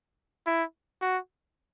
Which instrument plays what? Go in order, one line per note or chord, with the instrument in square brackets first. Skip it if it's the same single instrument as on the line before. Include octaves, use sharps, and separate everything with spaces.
[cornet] E4
F#4